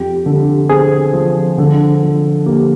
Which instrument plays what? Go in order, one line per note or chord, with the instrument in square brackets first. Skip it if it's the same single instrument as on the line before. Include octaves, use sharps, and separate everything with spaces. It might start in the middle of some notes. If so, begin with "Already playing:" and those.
Already playing: [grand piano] F2 [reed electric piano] G4
[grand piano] D3
[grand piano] C4 [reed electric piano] G#4
[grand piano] F3
D3
F3
[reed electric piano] A#3 [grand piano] G4